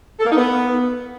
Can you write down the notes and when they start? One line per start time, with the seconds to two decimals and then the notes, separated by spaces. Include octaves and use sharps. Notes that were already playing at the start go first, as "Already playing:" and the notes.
0.20 A4
0.25 A#3
0.31 D#4
0.36 B3